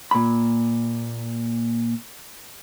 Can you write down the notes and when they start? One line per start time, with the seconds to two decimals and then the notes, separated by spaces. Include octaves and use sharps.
0.11 A#2 B5